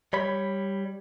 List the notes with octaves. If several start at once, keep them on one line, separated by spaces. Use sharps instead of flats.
G3 C#5 B5